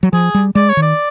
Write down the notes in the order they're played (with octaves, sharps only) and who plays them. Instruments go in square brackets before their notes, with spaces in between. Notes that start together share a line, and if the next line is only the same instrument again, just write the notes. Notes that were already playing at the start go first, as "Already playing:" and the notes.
[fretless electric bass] F#3
[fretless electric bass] F3 [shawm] G#4
[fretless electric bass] G3
[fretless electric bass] G#3 [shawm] D5
[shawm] C#5
[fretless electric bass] D#3
[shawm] D5